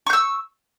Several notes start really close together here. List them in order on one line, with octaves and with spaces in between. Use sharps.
C#6 G6 E6